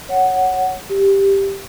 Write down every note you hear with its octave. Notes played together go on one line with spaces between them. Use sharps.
C#5 F#5
G4